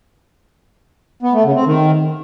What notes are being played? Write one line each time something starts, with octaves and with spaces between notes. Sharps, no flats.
B3
A3
C#3
C4
D#3